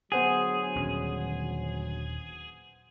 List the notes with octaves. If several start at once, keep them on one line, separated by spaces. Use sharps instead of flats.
D2 F#3 B3 G#4 C5 F#5
D#1 D#2 C#4